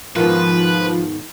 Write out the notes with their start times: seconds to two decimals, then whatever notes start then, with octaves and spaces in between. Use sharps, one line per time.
0.16 G#2 B2 D#3 F3 F4 B4